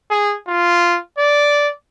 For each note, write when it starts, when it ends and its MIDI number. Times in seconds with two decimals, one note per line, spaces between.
0.10 0.35 68
0.48 0.98 65
1.18 1.69 74